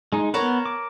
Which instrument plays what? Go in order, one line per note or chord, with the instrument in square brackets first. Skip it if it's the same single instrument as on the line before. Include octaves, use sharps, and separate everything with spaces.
[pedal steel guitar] G#3 D#4
[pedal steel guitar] B3 B4 [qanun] A#4 C#5 A5
[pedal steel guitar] D6